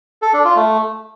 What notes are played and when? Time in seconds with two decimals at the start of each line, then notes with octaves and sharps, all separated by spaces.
0.22 A4
0.33 D4
0.45 F4
0.56 A3